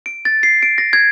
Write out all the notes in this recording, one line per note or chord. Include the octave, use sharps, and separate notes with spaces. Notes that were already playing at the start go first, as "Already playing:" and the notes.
D7
A6
C7
D7
A#6
G#6